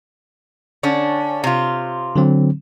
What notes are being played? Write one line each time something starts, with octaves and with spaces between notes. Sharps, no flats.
D3 C#4 D4
C3 F4
D3 F#3 C4